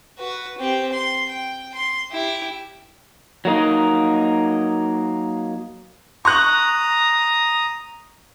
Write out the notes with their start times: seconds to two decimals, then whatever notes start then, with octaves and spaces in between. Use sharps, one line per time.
0.19 F#4 B4
0.58 C4 G4
0.93 C6
1.29 G5
1.75 C6
2.11 E4 G4
3.45 F#3 A#3 D#4
6.25 A#5 C#6 D#6 F#6